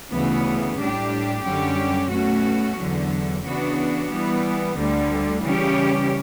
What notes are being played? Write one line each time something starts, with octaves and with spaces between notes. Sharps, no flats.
D2 C#3 E3 B3
A2 G3 D4 G4
F#2 D3 G3 C#4 G4
B2 A3 C#4 F#4
E2 D3 F#3
C#3 E3 B3 D4 F#4
E3 G3 B3
D2 D3 G3
C#3 E3 G3 C#4 G4